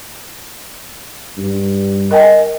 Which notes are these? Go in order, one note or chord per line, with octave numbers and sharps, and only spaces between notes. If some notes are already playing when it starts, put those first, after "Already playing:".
G2
A#4 D#5 G5 G#5